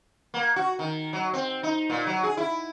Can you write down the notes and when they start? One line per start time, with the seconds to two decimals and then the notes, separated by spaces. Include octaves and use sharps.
0.34 A#3
0.56 F#4
0.79 D#3
1.13 F#3
1.33 C4
1.63 D#4
1.90 A#2
2.06 F#3
2.23 G#4
2.37 E4